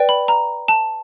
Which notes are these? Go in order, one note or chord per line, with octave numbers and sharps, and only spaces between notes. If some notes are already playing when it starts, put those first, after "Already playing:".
Already playing: B4 D5 G5
B5
A#5
A5